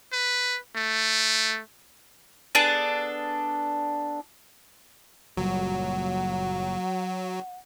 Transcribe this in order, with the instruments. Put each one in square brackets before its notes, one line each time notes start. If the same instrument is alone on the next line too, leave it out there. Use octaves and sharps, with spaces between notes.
[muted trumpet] B4
A3
[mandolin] B3 D4 G#4 A4
[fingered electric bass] F#1 A#2 G3 [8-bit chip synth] F#3 [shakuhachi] F#5